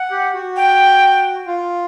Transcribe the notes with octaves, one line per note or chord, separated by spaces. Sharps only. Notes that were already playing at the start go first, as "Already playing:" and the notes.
Already playing: F#5
G4
F#4
G5
F4